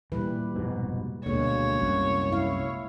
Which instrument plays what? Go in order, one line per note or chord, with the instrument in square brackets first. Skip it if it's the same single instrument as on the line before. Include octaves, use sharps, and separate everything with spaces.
[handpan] A#2 G3 B4 [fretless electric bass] E3
[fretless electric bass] F1 G#2 B2
[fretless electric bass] D2 B2 D3 [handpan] G#3 A#3 [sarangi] C#5
[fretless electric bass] C2 F#2
[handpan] E4 F5